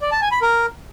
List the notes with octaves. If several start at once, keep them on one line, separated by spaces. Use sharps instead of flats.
D5
A5
G#5
B5
A#4